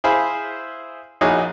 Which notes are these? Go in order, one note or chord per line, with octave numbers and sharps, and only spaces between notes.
E4 G#4 C5 F5 B5
A#1 D#4 E4 F#4 G#4 C#5